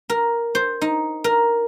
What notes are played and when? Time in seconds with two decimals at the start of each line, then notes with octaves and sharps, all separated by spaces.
0.10 A#4
0.55 C5
0.81 D#4
1.24 A#4